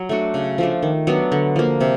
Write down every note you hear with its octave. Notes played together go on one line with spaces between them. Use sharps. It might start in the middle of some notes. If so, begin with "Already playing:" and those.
Already playing: F#3
A3 D4 F#4
C#3
F3 A3 D4
D#3
F#3 B3 D4
D3
F3 A#3
C3